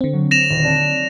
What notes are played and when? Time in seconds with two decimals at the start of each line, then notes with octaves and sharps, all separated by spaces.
0.01 D3 C4
0.13 F#3
0.31 A#6 E7 F7
0.50 D#1
0.64 D5 A5 F#6